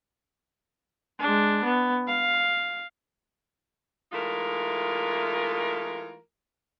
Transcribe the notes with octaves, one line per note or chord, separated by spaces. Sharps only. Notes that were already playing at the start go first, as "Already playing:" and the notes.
G#3 D4
B3
F5
E3 G#3 A3 D#4 F4 A#4